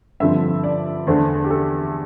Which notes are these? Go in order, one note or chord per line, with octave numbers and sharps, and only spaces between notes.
G2 D3 F3 C4 E5
D5
E2 D3 A3 D4 C5
G4
A4